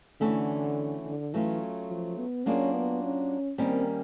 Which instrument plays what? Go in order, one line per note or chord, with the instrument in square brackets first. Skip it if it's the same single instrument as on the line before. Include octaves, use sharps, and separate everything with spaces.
[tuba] D3 [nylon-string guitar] E3 A3 C#4 F#4 A4
[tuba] D3
[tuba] E3 [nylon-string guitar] F#3 A3 C#4 F4
[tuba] F3
B3
[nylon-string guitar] F#3 A#3 D4 F4 G#4 [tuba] C#4
[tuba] B3
C#4
[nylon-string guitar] D#3 G3 A#3 C#4 [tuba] C4